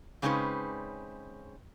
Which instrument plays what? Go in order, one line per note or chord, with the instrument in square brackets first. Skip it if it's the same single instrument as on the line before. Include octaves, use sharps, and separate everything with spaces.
[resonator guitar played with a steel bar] C#3 G#3 C4 C#4 D#4 B4